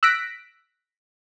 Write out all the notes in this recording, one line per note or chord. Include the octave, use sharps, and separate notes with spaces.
E6 F#6 A#6 B6 D7